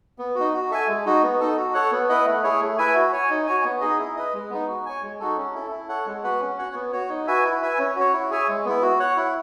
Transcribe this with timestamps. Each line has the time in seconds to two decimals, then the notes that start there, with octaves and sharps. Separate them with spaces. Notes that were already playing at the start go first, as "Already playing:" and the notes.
0.19 B3
0.35 D#4 F#4
0.54 F#4
0.71 A4 E5 G#5
0.88 G#3
1.05 D#4 F#4
1.23 B3
1.40 D#4 A4
1.57 F#4
1.74 A4 C#5 F#5
1.92 B3
2.09 E4 B4 D#5 F#5
2.26 A3
2.43 E4 G#4 C#5
2.61 A3
2.78 E4 B4 E5 G#5
2.94 F#4
3.12 C#5 G#5
3.30 D#4
3.46 F#4 C#5 G#5
3.64 B3
3.81 D#4 G#4 D#5
3.99 E4
4.16 B4 D#5
4.33 G#3
4.50 B3 D#4
4.68 F#4
4.85 C#5 G#5
5.02 G#3
5.20 D#4 F#4 A4
5.37 C#4
5.54 E4 A4
5.71 E4
5.89 A4 C#5 F#5
6.06 G#3
6.24 B3 F#4 B4 F#5
6.40 C#4
6.58 F#4 C#5 F#5
6.75 B3
6.92 F#4 C#5
7.09 D#4
7.27 F#4 B4 E5 G#5
7.44 E4
7.62 B4 E5 G#5
7.79 C#4
7.96 F#4 C#5
8.13 E4
8.30 G#4 C#5 E5 G#5
8.48 G#3
8.65 B3 E4
8.82 F#4
9.00 C#5 F#5
9.17 E4